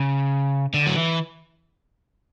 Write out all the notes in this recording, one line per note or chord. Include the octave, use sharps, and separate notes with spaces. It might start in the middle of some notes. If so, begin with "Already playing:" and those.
Already playing: C#3
D3
F#3
E3